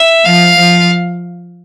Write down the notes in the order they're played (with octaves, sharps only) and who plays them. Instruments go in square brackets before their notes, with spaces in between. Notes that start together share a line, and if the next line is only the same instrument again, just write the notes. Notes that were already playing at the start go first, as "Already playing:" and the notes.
Already playing: [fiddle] E5
[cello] F3 [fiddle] F5
[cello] F3